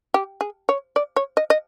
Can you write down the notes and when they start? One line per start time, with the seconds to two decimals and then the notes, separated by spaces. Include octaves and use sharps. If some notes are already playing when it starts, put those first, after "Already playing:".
0.14 G4
0.41 G#4
0.69 C#5
0.96 D5
1.16 C#5
1.37 D#5
1.50 D#5